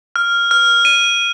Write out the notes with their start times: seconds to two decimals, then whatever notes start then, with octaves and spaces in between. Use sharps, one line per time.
0.16 F6
0.51 F6
0.85 D#7